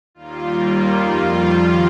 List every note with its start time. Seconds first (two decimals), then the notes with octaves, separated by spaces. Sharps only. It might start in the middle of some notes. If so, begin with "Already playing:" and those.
0.14 D#2 D#3 G3 A#3 F4
0.54 F4
0.95 F2 D#3 G3
1.34 F4